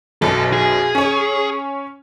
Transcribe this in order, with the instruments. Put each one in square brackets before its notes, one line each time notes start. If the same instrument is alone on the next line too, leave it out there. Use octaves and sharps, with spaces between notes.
[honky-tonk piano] B1 F#2 B2 [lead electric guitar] A4
[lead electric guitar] G#4
[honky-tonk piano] C#4 C#5